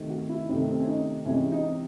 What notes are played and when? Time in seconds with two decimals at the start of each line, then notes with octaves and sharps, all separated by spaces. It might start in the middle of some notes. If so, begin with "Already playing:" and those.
Already playing: C3 D#3 A3
0.10 F#4
0.29 E4
0.49 C3 D#3 A3 D#4
0.71 C4
0.79 C#4
0.88 D#4
1.25 C3 E3 G#3 C#4
1.52 D#4